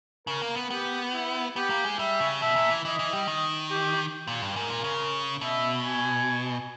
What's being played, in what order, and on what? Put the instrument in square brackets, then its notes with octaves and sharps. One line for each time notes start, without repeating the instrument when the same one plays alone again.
[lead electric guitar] C#3 [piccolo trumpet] A#4
[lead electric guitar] A#3
B3
[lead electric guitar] B3 [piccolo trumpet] G4
[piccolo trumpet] E4
[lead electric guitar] B3 [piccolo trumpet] G4
[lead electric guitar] A#3
G#3
[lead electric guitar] G3 [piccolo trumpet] E5
[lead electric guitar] C#3
[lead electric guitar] B2 [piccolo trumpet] E5
[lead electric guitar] A#2
E3
[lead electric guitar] E3 [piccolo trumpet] D#5
[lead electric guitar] E3
G3
D#3
[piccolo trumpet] G4
[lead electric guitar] A#2
G2
[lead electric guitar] G#2 [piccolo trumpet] A#4
[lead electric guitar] A#2
C#3
[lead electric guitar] B2 [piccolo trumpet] E5
[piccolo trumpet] G#5